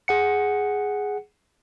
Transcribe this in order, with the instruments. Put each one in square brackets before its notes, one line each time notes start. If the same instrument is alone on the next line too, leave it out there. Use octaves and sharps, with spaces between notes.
[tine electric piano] G#4 F#5 C#7